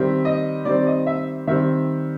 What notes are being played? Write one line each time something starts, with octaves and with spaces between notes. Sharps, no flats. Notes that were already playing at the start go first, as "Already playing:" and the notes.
Already playing: D#3 G3 C4 E5
D#5
D#3 G3 C4 D5
D#5
E5
D#3 G3 C4 E5